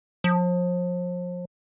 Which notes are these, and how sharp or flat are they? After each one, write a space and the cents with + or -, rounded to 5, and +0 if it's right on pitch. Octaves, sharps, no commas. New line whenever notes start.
F3 +35